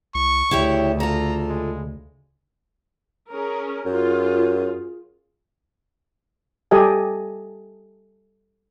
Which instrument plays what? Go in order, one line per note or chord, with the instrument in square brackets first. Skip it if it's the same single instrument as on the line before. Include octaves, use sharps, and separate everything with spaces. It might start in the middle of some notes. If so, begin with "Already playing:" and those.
[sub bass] C2 [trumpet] C#6
[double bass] D2 [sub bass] C#3 [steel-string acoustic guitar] E4 G4 C#5
[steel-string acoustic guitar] F4 A4 [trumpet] A#5
[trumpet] G#3
[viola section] C#4 G#4 A#4
[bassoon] F#2 [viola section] F4 G#4
[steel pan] G3 G4 A4 D#5 G#5